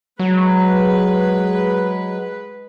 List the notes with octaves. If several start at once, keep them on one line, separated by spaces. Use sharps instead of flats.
F#3 G#3 B4